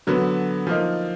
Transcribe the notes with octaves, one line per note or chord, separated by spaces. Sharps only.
D3 F#3 B3
F3 A#3 D#4